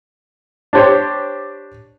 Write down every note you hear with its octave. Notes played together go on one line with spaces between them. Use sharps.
D4 G4 C5 C#5